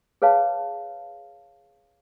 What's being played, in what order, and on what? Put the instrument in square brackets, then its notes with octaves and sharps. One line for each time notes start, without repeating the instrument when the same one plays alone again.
[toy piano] G#4 B4 C#5 F5 A5